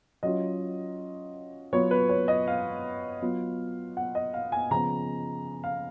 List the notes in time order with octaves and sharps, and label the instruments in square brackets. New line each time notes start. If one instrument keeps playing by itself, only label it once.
[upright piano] F#3 C#4 F4 D#5
F#3 B3 F4 C#5
B4
C#5
D#5
F5
F#3 B3 F4
F#5
D#5
F5
G#5
C#3 F3 B3 A#5
F5